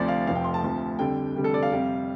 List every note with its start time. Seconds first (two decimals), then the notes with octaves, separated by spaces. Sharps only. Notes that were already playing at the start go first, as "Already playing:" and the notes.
Already playing: D2 C3 F3 D5
0.08 F5
0.27 F1 F2 F3 F5
0.35 G5
0.44 C6
0.54 A5
0.64 D2 C3 F3
0.99 F2 D3 G3 G5
1.36 F1 F2 D3 G3
1.44 A4
1.54 D5
1.63 F5
1.72 F2 C3 G3